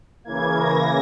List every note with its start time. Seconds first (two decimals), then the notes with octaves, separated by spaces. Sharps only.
0.24 C#3 E3 A#3 G#6
0.59 A#6